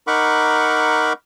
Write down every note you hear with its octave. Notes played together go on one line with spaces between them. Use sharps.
D#4 A#4 F#5 B5 C#6 D6